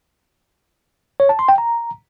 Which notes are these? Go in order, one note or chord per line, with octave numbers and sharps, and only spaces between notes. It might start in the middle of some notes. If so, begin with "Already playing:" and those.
C#5
A5
C6
G5
A#5